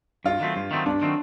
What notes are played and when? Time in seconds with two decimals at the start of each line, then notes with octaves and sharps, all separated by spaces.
0.24 G2 F4
0.40 D#3 F#3 A3 C4
0.56 G2
0.71 D#3 F#3 A3 C4
0.86 G2 D4
1.02 D#3 F#3 A3 C4